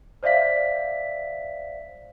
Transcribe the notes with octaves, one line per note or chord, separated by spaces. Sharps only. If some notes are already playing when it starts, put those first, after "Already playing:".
C5 D5 E5 F5 B6